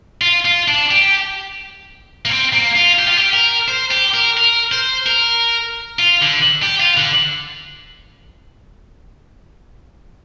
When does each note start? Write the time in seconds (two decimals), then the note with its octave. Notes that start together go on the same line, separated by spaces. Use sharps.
0.21 F4
0.45 F4
0.68 D4
0.91 G4
2.25 A#3
2.30 C4
2.53 A#3
2.76 F4
2.99 G4
3.08 F4
3.17 G4
3.34 A#4
3.68 C5
3.91 G4
4.14 A#4
4.37 A#4
4.72 C5
5.06 A#4
5.99 F4
6.22 D3
6.63 G4
6.80 F4
6.97 D3